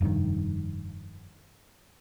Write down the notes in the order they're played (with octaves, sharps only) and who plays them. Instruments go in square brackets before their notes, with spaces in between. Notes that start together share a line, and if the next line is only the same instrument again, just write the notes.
[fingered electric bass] F1 G2 C3 D#3